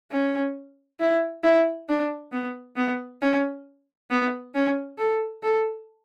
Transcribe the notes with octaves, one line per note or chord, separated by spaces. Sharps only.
C#4
E4
E4
D4
B3
B3
C#4
B3
C#4
A4
A4